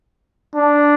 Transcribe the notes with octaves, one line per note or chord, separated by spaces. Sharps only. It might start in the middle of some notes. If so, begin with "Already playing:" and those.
D4